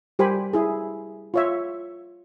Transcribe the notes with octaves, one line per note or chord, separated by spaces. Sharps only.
G3 G4 A#4 C5 G#5 B5
E4 G#4
F4 C#5 E5